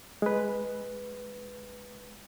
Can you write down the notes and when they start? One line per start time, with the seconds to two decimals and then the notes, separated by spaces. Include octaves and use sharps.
0.22 G#3 B4